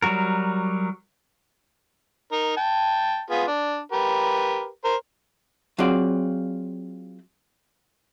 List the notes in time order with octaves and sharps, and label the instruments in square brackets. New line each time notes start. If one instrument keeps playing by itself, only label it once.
[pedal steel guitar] F#3 G3 F#4 A#4
[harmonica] D#4 A#4
G5 A5
B3 F4 G#4
D4
G4 A#4 B4
A#4 C5
[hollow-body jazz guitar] F#3 C4 F4 G#4 D5 C6